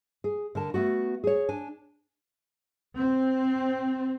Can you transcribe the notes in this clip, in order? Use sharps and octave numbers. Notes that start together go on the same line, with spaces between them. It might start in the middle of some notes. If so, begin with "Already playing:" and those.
G#4
D3 A#4 A5
A3 B3 F#4
G#4 C#5
D4 G#5
C4